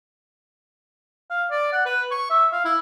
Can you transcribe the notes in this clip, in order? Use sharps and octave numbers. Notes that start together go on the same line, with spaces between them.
F5
D5
F#5
B4
C#6
E5
F5
E4